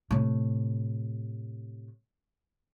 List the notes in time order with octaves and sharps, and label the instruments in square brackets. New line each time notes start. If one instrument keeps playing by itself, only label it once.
[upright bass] A2 C3